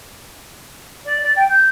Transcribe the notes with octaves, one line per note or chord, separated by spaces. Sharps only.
D5
D5
G5
G6